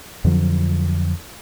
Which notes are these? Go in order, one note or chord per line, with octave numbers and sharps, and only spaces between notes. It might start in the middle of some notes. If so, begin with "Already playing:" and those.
F2 D3 F3 F#3